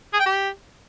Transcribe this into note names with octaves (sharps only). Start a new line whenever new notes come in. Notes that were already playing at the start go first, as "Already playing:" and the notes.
G#4
G5
G4